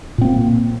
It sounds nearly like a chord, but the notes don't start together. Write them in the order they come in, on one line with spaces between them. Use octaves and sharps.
A#2 C4 A#3